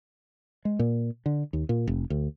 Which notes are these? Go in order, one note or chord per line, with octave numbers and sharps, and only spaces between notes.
G#3
A#2
D3
D#2
A#2
F1
D2